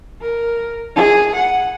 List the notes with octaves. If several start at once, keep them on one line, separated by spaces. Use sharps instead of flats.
A#4
G#4
F#5